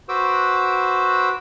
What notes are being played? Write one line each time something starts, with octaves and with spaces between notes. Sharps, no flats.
F#4 B4 C5 D6 E6